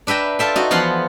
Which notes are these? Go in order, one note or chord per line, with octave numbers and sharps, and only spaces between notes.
D4 B4 E5 G5 A#5
F4 A4 E5 G5
D#4 F#4
E3 F3 B3 F4 F#5 C6